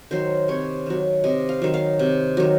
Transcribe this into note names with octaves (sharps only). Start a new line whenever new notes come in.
D#3 F#3 C5
C3 C#5
D#3 F#3
C3 D#5
F5
D#3 F#3
F5
C3
D#3 F#3